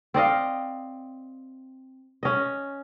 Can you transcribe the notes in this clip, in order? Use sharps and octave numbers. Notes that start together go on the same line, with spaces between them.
C4 D5 D#5 F5
C#4 D#5